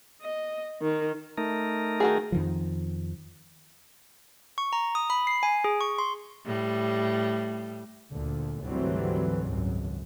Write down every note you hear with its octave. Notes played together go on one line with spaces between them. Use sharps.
D#5
D#3
A3 D#4 A#4
D#3 F#4 G#4
F2 D#3 F3
C#6
A#5
D#6
B5
C7
G#5
G#4
C#6
C6
A2 G3
D2 A#2 D3
G#1 D2 E3 F#3 G3 C4
G#1 C#2 F#2